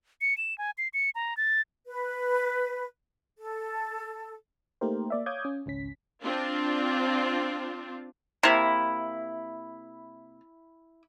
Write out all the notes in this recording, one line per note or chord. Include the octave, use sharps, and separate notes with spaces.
C#7
E7
G#5
C7
C#7
A#5
A6
B4
A4
A3 A#3 D#4 G4 A#4 C5
A#3 D5 E5
C#5 F5 D6 D#6 G6 G#6
C#4
G#1 C#2 C#4 B6
C4 D4 F4
C3 A#3 E4